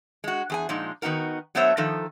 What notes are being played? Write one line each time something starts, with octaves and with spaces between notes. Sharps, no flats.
G#3 F#4
E2 G#4 G#5
A#2 F3 G#3 D#4
D#3 B3 D#4 F#4 A#4
F#3 A3 B3 C5 C#5 E5
D#3 F3 D#4 A4